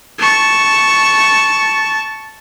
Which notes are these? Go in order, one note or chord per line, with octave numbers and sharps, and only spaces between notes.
A5 C#6